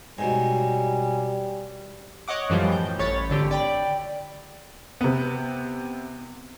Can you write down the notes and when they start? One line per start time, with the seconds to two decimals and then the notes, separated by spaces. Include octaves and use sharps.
0.18 G#2 B2 F#3 G3 G#5
2.28 C#5 D#5 F#5 D6
2.49 F#2 A2 E3 F3 G3
2.72 G6
2.99 A1 C#5 B5 A6
3.29 G#1 D3 G4
3.51 D5 G5 B5
5.01 C3 B3